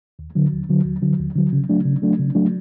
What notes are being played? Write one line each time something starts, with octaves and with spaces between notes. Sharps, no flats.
D#2
D3 F#3
D#2
D3 F#3
D#2
D3 F#3
D#2
D3 F#3
C#3
F#3 A3 D4
C#3
F#3 A3 D4
C#3
F#3 A3 D4